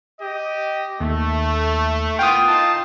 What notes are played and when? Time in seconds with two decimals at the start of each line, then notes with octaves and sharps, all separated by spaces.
0.20 G4 D#5
1.01 D#2 A3
2.19 B3 F4 G5 D#6
2.48 D#4 F4 A5